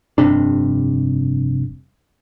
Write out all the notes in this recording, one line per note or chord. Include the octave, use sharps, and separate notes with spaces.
F1 G2 C3 D4